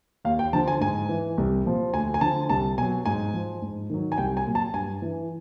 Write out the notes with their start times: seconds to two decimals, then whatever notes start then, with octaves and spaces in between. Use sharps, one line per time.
0.25 D#2 F5
0.39 G5
0.53 D3 F3 A5
0.68 G#5
0.81 G#2 G#5
1.09 E3
1.38 C2
1.65 A#2 F3
1.93 D2 G#5
2.14 G#5
2.21 D3 F3 A5
2.50 C2 A5
2.78 B2 G#5
2.82 F#3
3.06 G#2 G#5
3.34 F3
3.62 G#2
3.90 D#3 F#3
4.12 G#5
4.18 C2 G5
4.37 G#5
4.46 A#2 F#3
4.55 A5
4.74 G2 G#5
5.02 E3